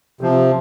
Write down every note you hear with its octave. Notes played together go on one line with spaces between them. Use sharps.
C3 F3